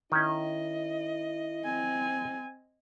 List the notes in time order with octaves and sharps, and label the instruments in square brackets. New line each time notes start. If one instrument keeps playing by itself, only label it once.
[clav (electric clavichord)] D#3 C#4 [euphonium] E4 [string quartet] D#5
[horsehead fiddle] C4 G#5